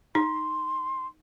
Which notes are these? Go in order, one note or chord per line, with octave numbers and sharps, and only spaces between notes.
D#4 C6